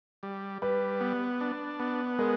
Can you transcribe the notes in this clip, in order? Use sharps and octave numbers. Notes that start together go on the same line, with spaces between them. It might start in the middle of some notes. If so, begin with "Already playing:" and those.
G3
G3 B4
B3
D4
B3
G#3 A#4